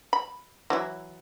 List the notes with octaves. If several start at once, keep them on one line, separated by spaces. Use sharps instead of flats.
B5
E3 F#3 E4